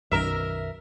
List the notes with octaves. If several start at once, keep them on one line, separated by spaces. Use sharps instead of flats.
B1 F#2 D#3 A#4 E5